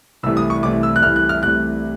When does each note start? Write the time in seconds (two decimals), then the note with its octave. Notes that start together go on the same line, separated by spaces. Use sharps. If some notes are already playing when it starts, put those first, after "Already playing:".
0.23 C2 C3 E3 A3 E6
0.37 D#6
0.50 C#6
0.63 C2 C3 E3 A3 D6
0.83 E6
0.96 F#6
1.03 C2 C3 E3 A3 F6
1.16 F#6
1.29 F6
1.43 C2 C3 E3 A3 F#6